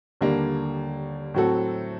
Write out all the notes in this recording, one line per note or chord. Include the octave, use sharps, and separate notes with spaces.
D#2 D3 G3 A#3 D4
A2 F#3 C4 F#4 A4